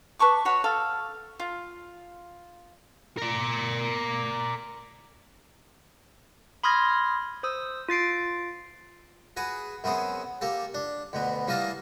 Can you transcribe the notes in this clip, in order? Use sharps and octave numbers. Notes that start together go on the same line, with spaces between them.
B4 A5 C#6 D6
F#4 C#5 F#5 B5
A4 F5
F4
A#4 D5
B5 C6 D#6 F6 G#6 A#6
C5 D#6 E6
F4 A6 C7 D7
F#4 G#4 B4
F#2 B3 C4 G#4
A#3 G4 A4
D4
D2 B2 B3
E3 G3 A#3 D#5 F5 A5